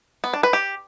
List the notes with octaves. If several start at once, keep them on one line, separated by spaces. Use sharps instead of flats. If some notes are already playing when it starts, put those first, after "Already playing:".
B3
D4
B4
G4